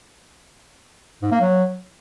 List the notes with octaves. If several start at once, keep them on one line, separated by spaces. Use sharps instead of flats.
G#2
A#3
F#3